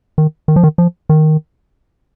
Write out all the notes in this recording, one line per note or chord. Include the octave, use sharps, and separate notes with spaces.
D#3
D#3
F3
D#3
F3
D#3